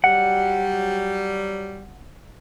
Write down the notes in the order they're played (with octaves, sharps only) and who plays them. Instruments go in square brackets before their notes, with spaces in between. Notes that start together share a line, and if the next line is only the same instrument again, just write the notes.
[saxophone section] F#3 G3 [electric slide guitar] F#5